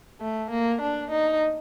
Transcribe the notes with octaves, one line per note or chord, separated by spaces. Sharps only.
A3
A#3
D4
D#4